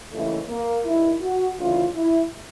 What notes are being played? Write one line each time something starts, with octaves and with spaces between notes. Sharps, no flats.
D#2 C#3 E3 A3
A#3
G2 D#3 E4
F#4
D2 C#3 E3 F4
E4